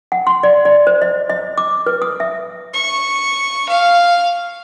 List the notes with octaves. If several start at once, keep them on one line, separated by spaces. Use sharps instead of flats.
F#5
C6
D5
D5
C5
D#5
D#5
D6
B4
D#6
E5
C#6
F5